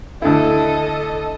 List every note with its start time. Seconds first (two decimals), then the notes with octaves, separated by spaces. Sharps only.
0.22 D2 E4 A4 D#5